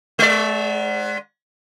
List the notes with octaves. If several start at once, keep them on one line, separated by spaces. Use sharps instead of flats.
G#3 D5